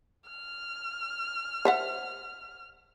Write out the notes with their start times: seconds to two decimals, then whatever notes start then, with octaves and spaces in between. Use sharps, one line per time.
0.29 F6
1.65 C5 E5 F#5